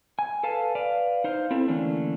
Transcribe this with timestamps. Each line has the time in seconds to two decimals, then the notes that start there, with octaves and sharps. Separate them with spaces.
0.19 G#5
0.43 A4 B4 F5 A5
0.75 B4 D5 F5
1.24 D#4 C5 F5
1.51 C4 E4 A4
1.68 D3 E3 A3 A#3 C#4 D4